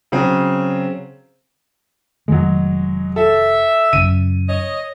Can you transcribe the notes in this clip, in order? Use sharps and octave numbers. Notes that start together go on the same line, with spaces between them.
C#3 F#3 C4
F1 D#3 F#3 G#3 A3
A4 E5
F#2 C#3 D#7
C#5 D#5